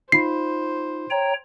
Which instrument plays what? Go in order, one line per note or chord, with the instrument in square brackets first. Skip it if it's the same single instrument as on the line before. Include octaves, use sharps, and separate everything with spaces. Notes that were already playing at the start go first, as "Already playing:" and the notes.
[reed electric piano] D#4 F4 B5 [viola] C5 [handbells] C7
[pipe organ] C#5 G5 A#5